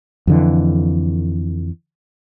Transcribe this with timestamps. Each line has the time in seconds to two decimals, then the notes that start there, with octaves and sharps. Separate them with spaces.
0.27 F2 D3 E3